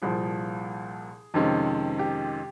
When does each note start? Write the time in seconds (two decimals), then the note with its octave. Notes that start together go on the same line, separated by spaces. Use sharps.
0.02 C2 A#2 F3 G#4
1.34 F2 C3 D#3 G#3 C#4
1.99 G4